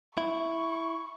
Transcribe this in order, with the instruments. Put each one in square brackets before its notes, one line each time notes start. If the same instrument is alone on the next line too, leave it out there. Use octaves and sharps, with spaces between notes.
[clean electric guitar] E4 [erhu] C#6